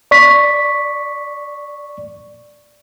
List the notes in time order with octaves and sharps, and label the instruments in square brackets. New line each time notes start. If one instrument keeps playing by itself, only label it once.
[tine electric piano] D5 C#6 B6